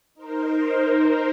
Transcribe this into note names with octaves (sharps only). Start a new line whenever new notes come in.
D#4 A#4 C5